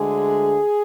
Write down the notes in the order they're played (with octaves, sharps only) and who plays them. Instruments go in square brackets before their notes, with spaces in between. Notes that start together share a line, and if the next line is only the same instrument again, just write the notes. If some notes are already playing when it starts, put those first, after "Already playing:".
Already playing: [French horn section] D2 D3 G#3 G#4